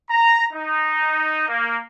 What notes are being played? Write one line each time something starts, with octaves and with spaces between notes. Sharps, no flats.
A#5
D#4
A#3